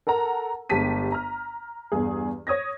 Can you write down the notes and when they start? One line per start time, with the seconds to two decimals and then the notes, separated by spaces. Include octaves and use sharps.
0.07 A4 A#4 F#5 A#5
0.69 G1 G#3 G4 A5 B6 D#7
1.12 A#5 F6
1.92 E2 G2 G#4
2.47 C#5 D#6 G#6 A#6